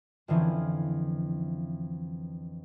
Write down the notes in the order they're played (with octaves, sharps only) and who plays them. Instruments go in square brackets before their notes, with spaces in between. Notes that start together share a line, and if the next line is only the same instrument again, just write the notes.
[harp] F2 D3 E3 F3 C4 C#4